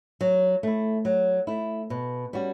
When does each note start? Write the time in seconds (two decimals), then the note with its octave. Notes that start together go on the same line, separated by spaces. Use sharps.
0.21 F#3
0.63 A3 E4
1.05 F#3
1.47 A3 E4
1.90 B2
2.33 G3 C#4 F#4